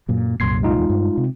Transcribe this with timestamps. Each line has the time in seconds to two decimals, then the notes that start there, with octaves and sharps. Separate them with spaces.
0.08 F#2 A#2 F#3
0.40 C2 F#2 A#2 C6 G#6 C7
0.63 G#3 D#4 F4
0.78 E2
0.90 G2
1.17 C3